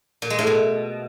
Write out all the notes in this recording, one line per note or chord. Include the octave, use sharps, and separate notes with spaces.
A#2
G#3
A2
B2